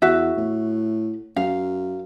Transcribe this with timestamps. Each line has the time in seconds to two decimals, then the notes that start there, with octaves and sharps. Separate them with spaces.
0.02 E2 F#4 E5
0.37 A2
1.36 F#2 F5